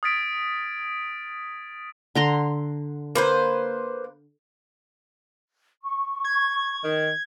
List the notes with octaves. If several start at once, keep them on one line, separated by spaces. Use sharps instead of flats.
D#6 F6 G#6 A6 B6 D7
D3 A#5 C6
A#3 B4 C5
C#6
G#6
D#3